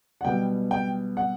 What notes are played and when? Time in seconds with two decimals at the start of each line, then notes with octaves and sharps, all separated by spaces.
0.21 F#5
0.25 B1 B2 G3 B3 G5
0.71 G5
1.17 F#5